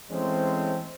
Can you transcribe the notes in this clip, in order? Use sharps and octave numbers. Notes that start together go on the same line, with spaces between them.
E3 G#3 A3 C4 C#4 C5